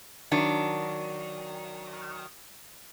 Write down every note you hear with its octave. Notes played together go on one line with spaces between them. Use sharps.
D#3 F#3 D4